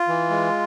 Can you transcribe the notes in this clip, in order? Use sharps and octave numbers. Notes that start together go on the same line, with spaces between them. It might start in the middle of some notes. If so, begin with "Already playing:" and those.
Already playing: F4
E3
G#3